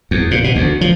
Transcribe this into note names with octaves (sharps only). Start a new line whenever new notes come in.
E2
A#2
B2
D2
F3